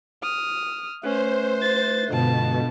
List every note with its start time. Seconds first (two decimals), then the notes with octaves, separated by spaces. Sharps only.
0.23 D#6 F6
1.03 A3 C#4 B4 C5
1.62 A6
2.10 G2 B2 D3 G#3 F4 A5